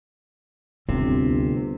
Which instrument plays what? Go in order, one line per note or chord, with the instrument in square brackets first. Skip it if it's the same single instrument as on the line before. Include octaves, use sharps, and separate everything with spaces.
[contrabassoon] G1 [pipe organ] D2 [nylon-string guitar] C3 [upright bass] C4